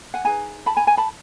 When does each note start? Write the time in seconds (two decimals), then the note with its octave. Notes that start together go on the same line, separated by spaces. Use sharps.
0.14 F#5 G#5
0.24 D#4 G#4 B4 G#5 A#5
0.66 A5 B5
0.77 G#5 A#5
0.87 G#5 A#5
0.97 A5 B5